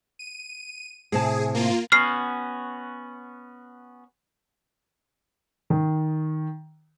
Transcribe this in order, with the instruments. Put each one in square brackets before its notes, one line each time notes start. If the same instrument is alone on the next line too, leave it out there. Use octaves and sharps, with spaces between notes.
[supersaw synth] D#7
[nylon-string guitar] A2 C3 A5 [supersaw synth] G#4
[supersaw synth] A#3 F4
[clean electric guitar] B3 C#4 F#4 [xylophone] F6 C7
[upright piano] D#3